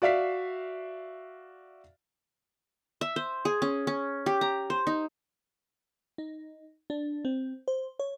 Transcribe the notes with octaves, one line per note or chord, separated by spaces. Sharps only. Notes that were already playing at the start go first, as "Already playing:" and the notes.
F#4 D5 E5 F5 B6 C7
E5
C5
G#4
C#4
C#4
G4
A#5
C5
D#4
D#4
D4
C4
C5
C#5